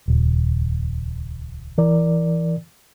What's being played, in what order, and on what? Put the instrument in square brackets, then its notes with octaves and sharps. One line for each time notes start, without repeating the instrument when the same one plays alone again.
[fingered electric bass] D#1 [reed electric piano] C#2
[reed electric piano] E3 A#4 D5